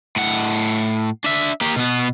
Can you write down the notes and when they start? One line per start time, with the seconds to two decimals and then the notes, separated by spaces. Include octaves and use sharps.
0.16 A2 F#5
1.24 D4 E5
1.61 A#3 G4
1.76 B2 B3